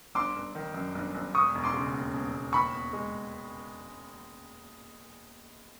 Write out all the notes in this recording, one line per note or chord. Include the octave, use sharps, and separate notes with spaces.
G1 C6 D6
G1
D#3
F#2
G1
G1
E1 C#6 D#6
E1
C6 D6
C#3
D#2
E1
E1
D#2 B5 C#6
B3
G#3